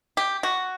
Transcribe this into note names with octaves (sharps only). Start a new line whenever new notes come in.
G4
F#4